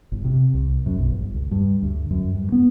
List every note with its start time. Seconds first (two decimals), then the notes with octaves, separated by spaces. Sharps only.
0.12 G1
0.24 C3
0.54 C2
0.86 F#2
0.98 B1
1.12 G1
1.34 C#2
1.51 G2
1.82 D2
2.11 F#2
2.34 G2
2.52 B3